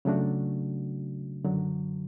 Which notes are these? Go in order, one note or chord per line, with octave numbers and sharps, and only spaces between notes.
C#3 F#3 A3 D4 F#4
F#2 D3 F#3